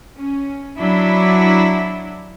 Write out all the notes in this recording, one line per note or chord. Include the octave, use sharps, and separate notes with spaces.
C#4
F#3 D4 E4